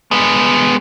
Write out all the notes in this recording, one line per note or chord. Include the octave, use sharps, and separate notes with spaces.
G#3 B3